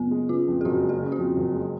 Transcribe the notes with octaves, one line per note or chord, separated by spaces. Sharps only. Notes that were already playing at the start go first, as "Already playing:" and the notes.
Already playing: F#1 B3
G#3
C#3 F4
F2
G#4
F#1 F#4
G#3
G#4
C#3
F#4
F2
F#1
G#3